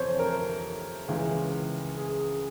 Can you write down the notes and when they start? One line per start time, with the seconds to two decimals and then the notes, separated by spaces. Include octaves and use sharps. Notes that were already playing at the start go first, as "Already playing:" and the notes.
Already playing: F2 C3 E3 C5 C#5
0.19 A#4
1.08 C#2 C#3 E3
1.97 G#4